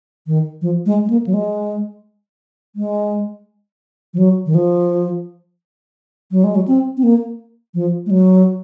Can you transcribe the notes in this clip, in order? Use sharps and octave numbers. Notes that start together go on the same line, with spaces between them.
D#3
F3
G#3
G#3
A#3
F#3
G#3
G#3
F3
F#3
D#3
F3
F#3
G#3
F#3
C4
C4
A#3
F3
G#3
F#3